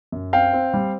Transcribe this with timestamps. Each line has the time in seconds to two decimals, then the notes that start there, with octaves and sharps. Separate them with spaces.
0.12 F#2
0.33 C4 F5 G5
0.53 C4
0.74 G3